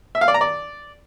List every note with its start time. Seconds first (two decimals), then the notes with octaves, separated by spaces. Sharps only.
0.15 E5
0.21 F5
0.28 D5
0.34 A#5
0.41 D5